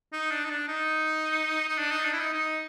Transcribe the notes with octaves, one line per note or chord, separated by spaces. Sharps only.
D#4
D4
D#4
D4
D#4
D#4
D4
D#4
D4
E4
D#4
D#4